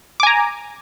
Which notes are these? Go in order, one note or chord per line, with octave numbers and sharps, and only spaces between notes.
G#5 A#5 D6